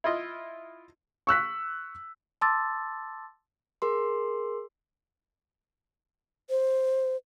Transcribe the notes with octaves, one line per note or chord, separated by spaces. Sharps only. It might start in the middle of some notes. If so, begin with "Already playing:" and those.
E4 F4 D#5
C#6 E6 F#6 B6
A5 C6 D6 E6 A6
G#4 A#4 C6
C5